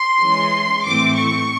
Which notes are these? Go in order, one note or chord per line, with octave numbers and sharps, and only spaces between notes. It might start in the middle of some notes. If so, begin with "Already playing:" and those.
Already playing: C6
E3 G#3 C#4
A2 E3 A3 C4 D6
C#6